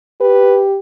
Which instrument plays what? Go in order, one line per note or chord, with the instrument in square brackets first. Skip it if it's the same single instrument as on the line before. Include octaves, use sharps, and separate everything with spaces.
[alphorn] G4 [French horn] B4